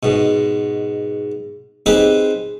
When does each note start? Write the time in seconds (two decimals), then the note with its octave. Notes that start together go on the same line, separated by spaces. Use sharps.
0.03 G#2 B2
1.86 C4 D#4 G4 G#4 B4 C5